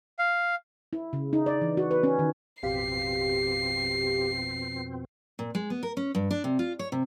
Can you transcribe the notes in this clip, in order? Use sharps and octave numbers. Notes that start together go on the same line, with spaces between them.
F5
E4
C#3
D#4
D5
E3
F#4
B4
C#4
D#3
A1 F2 B2 C4 G4 F5 B6 C7
A#2
G#3
B3
A#4
C#4
G2
D4
C3
F4
C#5
C3